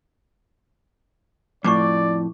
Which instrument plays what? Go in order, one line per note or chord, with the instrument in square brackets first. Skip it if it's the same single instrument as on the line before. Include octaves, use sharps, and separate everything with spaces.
[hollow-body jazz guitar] F2 A2 [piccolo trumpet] D5 [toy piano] C#6 D6